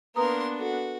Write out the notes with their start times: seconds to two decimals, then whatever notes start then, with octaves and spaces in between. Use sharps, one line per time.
0.16 A#3 B3 D4 B4 A#5 C6 D#6
0.59 F#4 A4